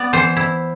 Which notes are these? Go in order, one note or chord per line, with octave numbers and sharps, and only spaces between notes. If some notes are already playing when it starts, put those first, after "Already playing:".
Already playing: B3 D5
E3 C5
E4